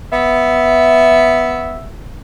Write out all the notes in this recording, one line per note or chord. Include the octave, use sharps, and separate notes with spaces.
B3 E5